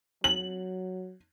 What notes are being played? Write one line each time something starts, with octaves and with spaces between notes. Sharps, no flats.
F#3 F#7